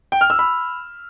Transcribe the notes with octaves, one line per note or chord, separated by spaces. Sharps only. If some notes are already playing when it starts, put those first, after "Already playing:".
G5
F6
E6
B5